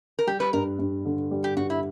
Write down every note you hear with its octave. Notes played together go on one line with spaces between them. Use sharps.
A#4
G3 G4
B4
G2 A#4
G2
D3
G3
G4
G2 F#4
E4